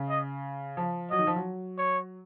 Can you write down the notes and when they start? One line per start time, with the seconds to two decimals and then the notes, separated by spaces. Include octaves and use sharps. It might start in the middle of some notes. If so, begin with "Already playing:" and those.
Already playing: C#3
0.10 D#5
0.77 F3
1.11 F#3 D#5
1.19 D#3
1.27 F3
1.36 F#3
1.79 C#5